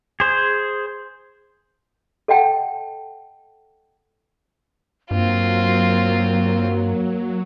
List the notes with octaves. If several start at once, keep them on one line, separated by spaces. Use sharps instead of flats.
G#4 C5
A4 D#5 F#5 G5 A5
G2 F#3 A#3 C4 F4